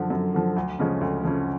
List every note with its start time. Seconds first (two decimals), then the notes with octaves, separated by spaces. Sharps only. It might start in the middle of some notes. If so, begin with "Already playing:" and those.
Already playing: F#2 D3 F3
0.10 F#2
0.34 D3 F3
0.56 D2
0.79 C#3 F3 G#3 C#4
1.01 D2
1.24 C#3 F3 G#3 C#4